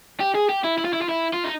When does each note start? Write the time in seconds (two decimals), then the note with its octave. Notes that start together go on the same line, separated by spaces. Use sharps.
0.21 G4
0.35 G#4
0.49 G4
0.64 E4
0.78 E4
0.85 F4
0.93 E4
1.02 F4
1.09 E4
1.33 F4
1.44 D#4